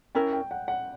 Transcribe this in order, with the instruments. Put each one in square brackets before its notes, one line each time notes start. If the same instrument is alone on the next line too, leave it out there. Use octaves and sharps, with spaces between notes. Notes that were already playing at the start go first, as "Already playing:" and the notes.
[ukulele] C#4 E4 A#4 [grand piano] G5
[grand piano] G5
F#5
F#5